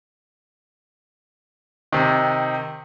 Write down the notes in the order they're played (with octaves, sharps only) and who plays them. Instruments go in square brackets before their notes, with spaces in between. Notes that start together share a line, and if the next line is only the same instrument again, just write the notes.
[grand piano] C3 D#3